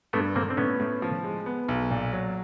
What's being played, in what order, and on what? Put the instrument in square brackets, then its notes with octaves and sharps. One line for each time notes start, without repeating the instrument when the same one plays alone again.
[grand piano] G2 [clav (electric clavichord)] A3 B3
[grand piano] D3 [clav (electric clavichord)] A#3 C4
[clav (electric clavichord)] C4
[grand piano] A2 [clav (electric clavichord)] B3 C#4
[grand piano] A2
F3
G#3
B3
B1
A#2
F#3